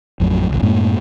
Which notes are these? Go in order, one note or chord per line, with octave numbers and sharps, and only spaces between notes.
A1 F2 A2 F#3
G#1 C#2
F#2 A2 G#3 A#3